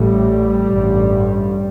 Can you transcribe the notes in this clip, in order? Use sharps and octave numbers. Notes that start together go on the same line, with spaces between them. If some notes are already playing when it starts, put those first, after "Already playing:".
Already playing: A1 A2 G3
A1 G2